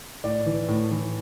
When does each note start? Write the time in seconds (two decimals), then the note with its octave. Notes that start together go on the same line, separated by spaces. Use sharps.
0.24 A2 D5
0.46 E3
0.68 A2
0.91 E3